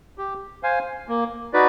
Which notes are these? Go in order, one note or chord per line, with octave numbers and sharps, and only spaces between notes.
G4
C5 F5 G#5
A#3
D#4 F#4 B4 D5